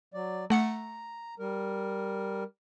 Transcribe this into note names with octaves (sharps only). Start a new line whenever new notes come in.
F#3 D5
A3 F#5 A#5 C#7
G3 A#4